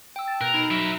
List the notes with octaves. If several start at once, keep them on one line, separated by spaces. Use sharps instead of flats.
G5 E6
A5
B2 A#4 F#6 G6
D#4 B5
F#3 A#4 E5